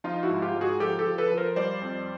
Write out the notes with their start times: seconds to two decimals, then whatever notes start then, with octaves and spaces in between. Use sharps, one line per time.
0.04 F3 D#4 F4
0.23 E4 F#4
0.30 G#2
0.42 F4 G4
0.55 G#2
0.61 F#4 G#4
0.80 F3 G4 A4
0.99 G4 A4
1.06 F3
1.18 A4 B4
1.31 F3
1.37 A#4 C5
1.56 G3 C5 D5
1.81 F2